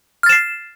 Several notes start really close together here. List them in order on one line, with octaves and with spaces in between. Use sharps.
F6 A6 E7 C7